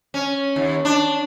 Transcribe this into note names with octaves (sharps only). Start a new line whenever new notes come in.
C#4
D#2
D4